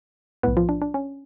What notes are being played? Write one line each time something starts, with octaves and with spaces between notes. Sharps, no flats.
B1 A2 B3 B4
F3 F4
D4
D4
C#4